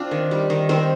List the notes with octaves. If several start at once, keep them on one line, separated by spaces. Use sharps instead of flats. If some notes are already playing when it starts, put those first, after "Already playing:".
Already playing: C4 D4 F4
D#3
G3
D#3
D#3 C4